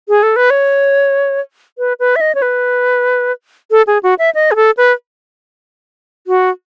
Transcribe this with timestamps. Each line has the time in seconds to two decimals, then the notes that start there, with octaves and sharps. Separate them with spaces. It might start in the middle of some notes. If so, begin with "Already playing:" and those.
0.09 G#4
0.23 A4
0.36 B4
0.50 C#5
1.78 B4
2.00 B4
2.16 E5
2.21 D#5
2.35 C#5
2.42 B4
3.71 A4
3.87 G#4
4.03 F#4
4.19 E5
4.35 D#5
4.51 G#4
4.56 A4
4.77 B4
6.27 F#4